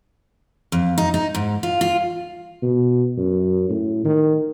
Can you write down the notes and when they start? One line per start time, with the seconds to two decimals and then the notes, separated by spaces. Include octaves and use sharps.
0.72 F2
0.98 D#4
1.14 D#4
1.35 G#2
1.63 F4
1.81 F4
2.63 B2
3.18 F#2
3.69 A2
4.05 D#3